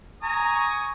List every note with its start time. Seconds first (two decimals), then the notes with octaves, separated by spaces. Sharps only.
0.23 G#5 A#5 C#6 D#6